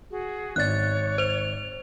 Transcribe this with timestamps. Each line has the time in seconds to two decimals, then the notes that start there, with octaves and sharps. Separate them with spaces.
0.11 F#4 G#4
0.56 G#1 C#5 D5 F#6 A6
1.18 C5 F7